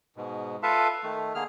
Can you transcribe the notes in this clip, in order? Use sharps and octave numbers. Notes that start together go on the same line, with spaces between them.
G#2 B2
F4 A4 B4 E5 F5 A5
D#3 A3
D3 A#3 G#4 F6